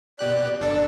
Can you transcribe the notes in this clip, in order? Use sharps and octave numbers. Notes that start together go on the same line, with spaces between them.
B2 G4 D5 F#6
G1 D4 A4 D5